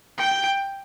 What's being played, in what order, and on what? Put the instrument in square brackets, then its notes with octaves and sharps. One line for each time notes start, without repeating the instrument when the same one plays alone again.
[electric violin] G5